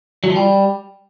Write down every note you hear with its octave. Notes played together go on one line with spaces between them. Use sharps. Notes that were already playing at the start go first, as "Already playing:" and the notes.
F#3
F3
G3